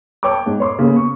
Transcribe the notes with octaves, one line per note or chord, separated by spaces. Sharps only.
C#5 G5 A5 D6
G#2
C#5 C6 D6
C#3 A#3 B3
C#6